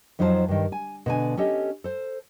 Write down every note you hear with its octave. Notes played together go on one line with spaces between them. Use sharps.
F2 F#3 D#4 F4 C5 A5
G2 D#3
G#5
B2 D3 G#5
C#4 G4 A4 D#5
A4 C5